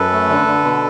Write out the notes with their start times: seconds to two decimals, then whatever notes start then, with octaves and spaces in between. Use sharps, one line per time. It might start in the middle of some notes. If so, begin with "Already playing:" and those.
Already playing: F#2 A4 B4
0.12 A3
0.29 D3
0.47 D3
0.64 B2